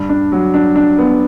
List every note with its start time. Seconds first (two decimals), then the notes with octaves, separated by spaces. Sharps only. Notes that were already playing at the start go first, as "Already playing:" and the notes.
Already playing: G2
0.09 D4
0.32 F#3
0.54 D4
0.76 D4
0.98 B3